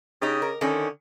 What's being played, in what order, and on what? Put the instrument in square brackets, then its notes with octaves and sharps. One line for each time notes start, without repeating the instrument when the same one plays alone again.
[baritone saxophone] C#3 [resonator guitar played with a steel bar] D#4 G4
[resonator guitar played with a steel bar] A#4
[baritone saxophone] D3 [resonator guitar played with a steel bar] D#3 C#4